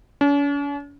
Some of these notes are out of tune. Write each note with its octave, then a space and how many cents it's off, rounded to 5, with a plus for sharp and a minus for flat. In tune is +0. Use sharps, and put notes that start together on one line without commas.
C#4 +45